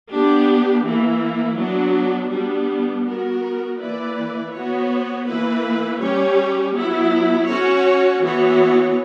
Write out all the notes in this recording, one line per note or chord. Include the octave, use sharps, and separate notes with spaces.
B3 D4 G4
E3 A#3 E4
F#3 B3 D4 F#4
G3 B3 D4
B3 F#4 A#4
E3 A#3 E4 B4 D5
B3 F#4 C#5
E3 A#3 E4 B4
G3 C#4 G4 C#5
F#3 B3 E4
C#4 F#4 C#5
E3 B3 F#4 C#5